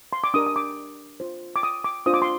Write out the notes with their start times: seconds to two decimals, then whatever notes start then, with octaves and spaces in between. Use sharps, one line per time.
0.13 C6
0.24 D6
0.34 D4 G4 A#4 D#6
0.46 D#6
0.56 D6
1.20 F4 C5
1.56 D6
1.63 D#6
1.84 D6
2.06 D4 F4 C5 D#6
2.14 D6
2.22 C6